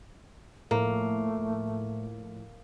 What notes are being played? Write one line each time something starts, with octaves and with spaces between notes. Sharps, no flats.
A2 F3 A3 A#3